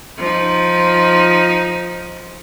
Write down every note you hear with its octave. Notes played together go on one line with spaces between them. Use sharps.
F3 D#4